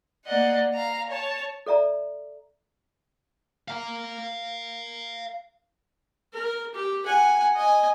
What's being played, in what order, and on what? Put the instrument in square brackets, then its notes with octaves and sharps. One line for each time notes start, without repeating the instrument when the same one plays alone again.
[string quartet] A#3 D5 D#5 F#5
F5 A#5
C#5 A5
[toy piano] A4 D5 E5 A#5
[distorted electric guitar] F5 A#5
[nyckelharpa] A#4
G4
F#5 G#5
D#5 G#5